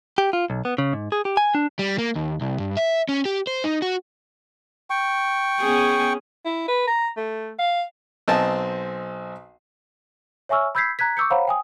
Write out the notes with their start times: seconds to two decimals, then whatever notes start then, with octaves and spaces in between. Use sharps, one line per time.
0.18 G4
0.33 F4
0.50 B1
0.65 B3
0.78 C#3
0.93 G#2
1.12 G#4
1.25 G4
1.37 G#5
1.55 D4
1.79 G3
1.98 A#3
2.15 D#2
2.41 C2
2.60 G2
2.77 E5
3.09 C#4
3.25 G4
3.47 C5
3.64 D#4
3.82 F#4
4.90 G5 C#6
5.60 B3 C#4 G#4
6.45 E4
6.68 B4
6.87 A#5
7.17 A3
7.59 F5
8.28 B1 C4 C5 D#5 G#5 A5
10.49 C#5 E5 G#5 C#6 E6 F6
10.75 B5 E6 G6 G#6 B6 C7
10.99 A#5 F#6 G#6 B6
11.17 C#6 D6 E6 G6 C#7
11.30 C5 C#5 F5 F#5 A#5 B5
11.47 G5 G#5 D#6